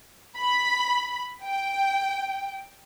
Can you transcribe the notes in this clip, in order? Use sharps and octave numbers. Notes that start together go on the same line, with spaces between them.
B5
G5